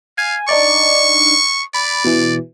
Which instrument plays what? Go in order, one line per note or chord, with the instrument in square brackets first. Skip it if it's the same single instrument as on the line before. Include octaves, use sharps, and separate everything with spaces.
[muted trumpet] F5 [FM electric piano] G#5
[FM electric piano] D4 D#4 D5 [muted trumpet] C#6
[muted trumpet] D5 [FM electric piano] B5
[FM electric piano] B2 E3